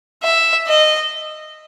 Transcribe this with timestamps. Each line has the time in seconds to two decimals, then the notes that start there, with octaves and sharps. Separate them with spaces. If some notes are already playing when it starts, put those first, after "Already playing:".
0.23 E5
0.67 D#5